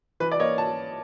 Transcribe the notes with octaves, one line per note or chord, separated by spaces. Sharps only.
E3 B4
D5
A#3 C#5 D#5
A5